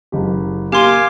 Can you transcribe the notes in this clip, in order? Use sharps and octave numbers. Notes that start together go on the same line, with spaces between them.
F#1 C#3 G4
A#3 G4 F5 G#5 C6 D6 D#7